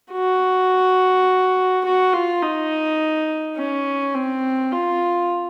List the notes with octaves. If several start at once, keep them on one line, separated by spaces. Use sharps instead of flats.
F#4
F#4
F4
D#4
C#4
C4
F4